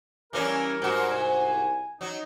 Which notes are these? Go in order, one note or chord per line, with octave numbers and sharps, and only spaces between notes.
E3 G3 A#3 C#4 A#4
G#2 F#4
C2 G#5
F#3 D#4